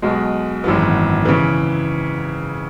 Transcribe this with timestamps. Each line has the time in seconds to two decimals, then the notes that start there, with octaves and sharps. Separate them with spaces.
0.02 B1 B2 G#3
0.64 G#1 F#2 E3 B3
1.25 C#3 E3